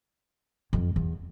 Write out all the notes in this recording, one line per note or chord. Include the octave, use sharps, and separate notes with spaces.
F2
E2